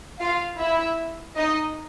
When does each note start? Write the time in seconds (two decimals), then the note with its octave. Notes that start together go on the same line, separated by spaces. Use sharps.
0.19 F4 F5
0.58 E4 E5
1.36 D#4 D#5